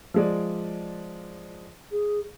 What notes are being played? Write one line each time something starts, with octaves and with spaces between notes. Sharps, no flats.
F3 G#3 D5
G#4